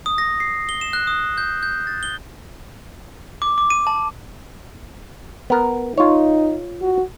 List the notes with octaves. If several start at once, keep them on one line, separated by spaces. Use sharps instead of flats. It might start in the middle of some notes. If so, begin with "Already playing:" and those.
D#6
A#6
C7
G7
E7
F#6
D#6
G6
G6
A6
G7
D6
D6
D#7
A5
B3 A#4
D#4 F4 C#5
F#4